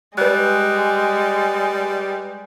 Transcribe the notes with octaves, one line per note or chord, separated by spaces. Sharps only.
G3 G#3 B4 F#6